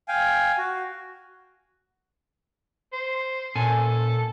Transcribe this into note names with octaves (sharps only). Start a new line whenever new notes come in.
F5 G5 G#5
F#4
C5
A#2 C#4 A4 G#5